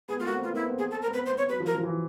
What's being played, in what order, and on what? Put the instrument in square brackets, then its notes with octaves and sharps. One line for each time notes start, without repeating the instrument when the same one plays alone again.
[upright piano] B3 [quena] G#4
[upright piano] A3
[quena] F4
[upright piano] A#3 [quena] F#4
[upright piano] C4
[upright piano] B3 [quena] F4
[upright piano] A#3 [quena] E4
[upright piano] B3
C4
[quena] G#4
A4
A#4
[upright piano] B3
[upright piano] C4 [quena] B4
[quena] C5
[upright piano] B3
[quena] C#5
[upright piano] F#3 [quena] B4
[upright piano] F3
[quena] A#4
[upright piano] F3
E3